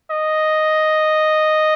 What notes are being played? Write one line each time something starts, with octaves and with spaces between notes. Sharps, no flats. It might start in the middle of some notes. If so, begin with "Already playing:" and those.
D#5